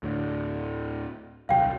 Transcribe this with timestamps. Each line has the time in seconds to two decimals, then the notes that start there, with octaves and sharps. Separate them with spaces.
0.03 D2 A2 D3
1.49 D#1 C2 F#3 F5 G5